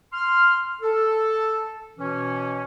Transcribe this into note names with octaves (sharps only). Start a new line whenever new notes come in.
C6 F6
A4
B2 E3 C#4